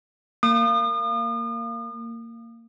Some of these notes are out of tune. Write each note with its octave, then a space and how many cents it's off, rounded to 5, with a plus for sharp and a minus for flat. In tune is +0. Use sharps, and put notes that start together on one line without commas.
A#3 -20 D#6 -40